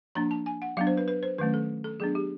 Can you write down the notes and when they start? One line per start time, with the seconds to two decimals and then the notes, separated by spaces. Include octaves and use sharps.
0.15 F3 A#3 D4 A#5
0.31 A5
0.46 G#5
0.62 F#5
0.77 F#3 B3 D4 F5
0.87 C5
0.97 B4
1.08 B4
1.23 C5
1.38 D#3 F#3 A3 C#4 B4
1.54 A4
1.84 A4
2.00 F#3 B3 D4 G#4
2.15 G4